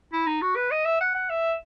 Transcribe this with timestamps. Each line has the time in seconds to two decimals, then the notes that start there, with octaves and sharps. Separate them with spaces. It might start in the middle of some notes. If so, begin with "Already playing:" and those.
0.13 E4
0.27 D#4
0.42 F#4
0.56 B4
0.71 D#5
0.86 E5
1.01 F#5
1.15 F#5
1.30 E5